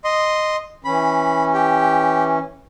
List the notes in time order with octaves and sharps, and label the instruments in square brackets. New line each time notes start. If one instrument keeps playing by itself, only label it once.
[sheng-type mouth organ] D#5 C6
[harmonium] E3 C#4 [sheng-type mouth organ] B5
[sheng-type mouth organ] G4